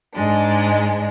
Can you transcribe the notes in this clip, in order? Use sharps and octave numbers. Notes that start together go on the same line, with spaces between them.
G#2 G#3 D4